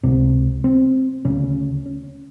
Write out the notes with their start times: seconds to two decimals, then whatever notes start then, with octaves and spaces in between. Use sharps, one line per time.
0.03 C#2 C3 C4
0.64 C4
1.25 D2 C#3 C#4
1.86 C#4